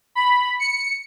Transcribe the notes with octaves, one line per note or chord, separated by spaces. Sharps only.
B5
C#7